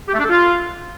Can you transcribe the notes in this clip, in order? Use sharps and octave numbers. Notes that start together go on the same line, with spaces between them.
G4
A3
D4
A4
F4